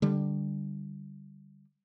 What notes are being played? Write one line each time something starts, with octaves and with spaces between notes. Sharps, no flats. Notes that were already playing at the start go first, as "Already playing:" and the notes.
D3 G3